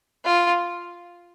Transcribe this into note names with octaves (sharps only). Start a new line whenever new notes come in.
F4